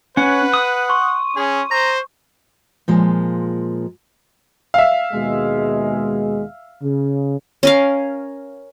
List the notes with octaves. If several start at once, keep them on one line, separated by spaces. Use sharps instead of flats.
C#4 B4 F#5
D#6
C6 C#6
C#4 G#4
C5 A#5
A#2 F3 G#3
E5 F5
D#2 B2 G#3
C#3
C#4 A#4 F5